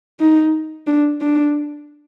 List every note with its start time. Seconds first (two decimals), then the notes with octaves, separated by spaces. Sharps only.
0.20 D#4
0.87 D4
1.21 D4